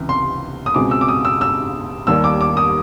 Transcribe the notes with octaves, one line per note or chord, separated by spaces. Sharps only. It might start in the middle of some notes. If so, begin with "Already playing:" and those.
Already playing: C#2 C3 E3
C6
D#6
C#2 B2 G#3 C4 D6
E6
D6
D#6
E6
E6
D#2 D#3 G3 A#3 E6
D6
D6
D#6